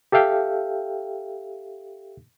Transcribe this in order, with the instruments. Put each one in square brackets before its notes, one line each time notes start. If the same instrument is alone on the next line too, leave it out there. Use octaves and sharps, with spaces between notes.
[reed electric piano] G4 A4 E5 F5 G5